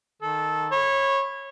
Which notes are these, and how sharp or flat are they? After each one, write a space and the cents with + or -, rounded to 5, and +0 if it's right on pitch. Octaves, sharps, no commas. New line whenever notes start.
D#3 -5 A4 -15
C#5 -20 B5 +10